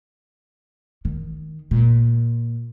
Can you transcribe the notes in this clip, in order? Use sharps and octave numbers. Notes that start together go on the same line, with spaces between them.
D#3
A#2